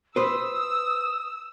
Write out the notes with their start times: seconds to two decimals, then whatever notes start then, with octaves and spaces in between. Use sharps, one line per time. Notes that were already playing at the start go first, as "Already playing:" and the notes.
0.16 B4 C5 D#6 E6